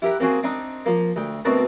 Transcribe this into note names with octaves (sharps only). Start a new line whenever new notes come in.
E4 G4 A#4 E5 F#5
A#3 C4 F#4 G#4
C4 D4 D#4
F3 A#3
D2 G5
D2 B2 C4 F#4 A#4 A5